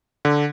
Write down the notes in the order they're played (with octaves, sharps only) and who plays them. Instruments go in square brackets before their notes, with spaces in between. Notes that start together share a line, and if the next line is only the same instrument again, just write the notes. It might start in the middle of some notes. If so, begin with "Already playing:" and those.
[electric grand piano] D3